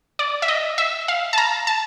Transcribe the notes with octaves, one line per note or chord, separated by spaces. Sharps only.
D5
E5
D#5
E5
F5
A5
A#5
A5